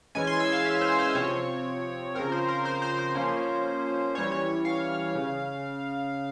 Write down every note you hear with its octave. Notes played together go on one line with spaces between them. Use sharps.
E3 G#3 C#4 G#5
C6
E6
F5
E5
C5
C5
C3 F3 C4 C#5
C#3 F3 C4 A#4
C5
A#4
C5
C5
C5
F3 A#3 C#4
E3 G3 C#4 C#5
C#5
F5
C#3